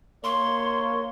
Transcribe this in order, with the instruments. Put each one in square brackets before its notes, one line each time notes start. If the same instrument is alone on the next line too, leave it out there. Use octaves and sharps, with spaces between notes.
[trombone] A#3 [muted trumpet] C#5 [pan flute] C6